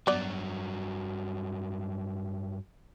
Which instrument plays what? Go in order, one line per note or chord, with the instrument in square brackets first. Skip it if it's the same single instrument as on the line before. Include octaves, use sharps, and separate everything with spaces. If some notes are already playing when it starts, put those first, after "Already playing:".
[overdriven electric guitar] G2 F#3 [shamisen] B3 D5